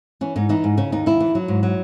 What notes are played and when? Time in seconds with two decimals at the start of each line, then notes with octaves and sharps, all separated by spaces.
0.21 E3 C#4
0.36 G#2 D#4
0.49 E3 D#4
0.64 G#2
0.77 C#3 C#4
0.92 D#2 D#4
1.06 D#2 E4
1.20 E3
1.35 F#3
1.48 G#2
1.63 F#3